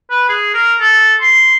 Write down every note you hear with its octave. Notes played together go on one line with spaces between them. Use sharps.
B4
G#4
A#4
A4
C6